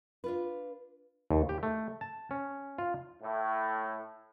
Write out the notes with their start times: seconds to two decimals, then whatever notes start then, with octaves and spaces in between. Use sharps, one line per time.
0.24 D4 F4 B4
1.31 D#2
1.49 G4
1.63 A3
2.01 A5
2.31 C#4
2.79 F4
3.22 A2